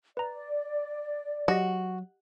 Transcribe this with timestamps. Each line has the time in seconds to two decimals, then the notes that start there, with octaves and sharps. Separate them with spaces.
0.17 B4 D5 A#5
1.48 F#3 F#4 G4 D#5